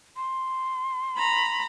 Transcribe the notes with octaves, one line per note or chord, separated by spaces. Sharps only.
C6
A#5 B5